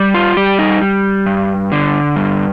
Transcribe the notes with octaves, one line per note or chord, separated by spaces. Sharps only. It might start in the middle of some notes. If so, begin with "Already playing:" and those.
Already playing: G3
F4
G3 G4
D#4
G3
G2
D3
G2